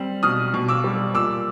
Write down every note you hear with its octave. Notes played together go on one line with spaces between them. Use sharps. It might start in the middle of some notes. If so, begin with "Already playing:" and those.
Already playing: G3 C4
B2 D#6 F6
B2
D6 E6
G3
A#2 D6 E6